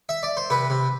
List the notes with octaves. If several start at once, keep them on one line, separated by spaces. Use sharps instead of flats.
E5
D5
C5
C3 B4
C3